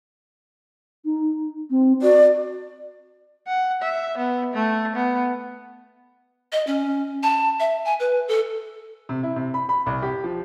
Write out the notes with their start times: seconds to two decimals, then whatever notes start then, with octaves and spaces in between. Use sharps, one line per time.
1.05 D#4
1.71 C4
2.02 F#4 D5
3.47 F#5
3.82 E5
4.18 B3
4.54 A3
4.96 B3
6.52 D#5
6.67 C#4
7.23 A5
7.60 E5
7.85 G#5
8.00 B4
8.28 A4
9.09 C3
9.23 E4
9.36 C3
9.54 B5
9.69 B5
9.86 C2
10.02 G4
10.24 F3